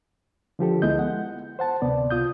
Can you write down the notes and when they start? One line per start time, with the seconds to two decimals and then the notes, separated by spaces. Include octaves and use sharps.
0.59 D3 F3 G4 A4
0.82 D2 G#3 B3 E4 D#5 G6
0.99 F#5
1.59 C5 F#5 A5
1.82 D2 C3 B3 D5
2.11 C2 F4 D#6 G6